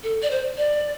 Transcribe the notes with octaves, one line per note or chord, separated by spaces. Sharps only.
A4
D5
C5
D5